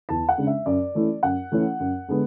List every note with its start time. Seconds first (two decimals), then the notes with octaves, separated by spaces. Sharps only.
0.09 E2 A5
0.29 F#5
0.38 C#3 G#3 D4
0.47 E5
0.66 F#2 D5
0.95 E3 A3 C#4 E4
1.23 F#2 F#5
1.52 E3 A3 C#4 E4
1.80 F#2
2.09 D3 G#3 B3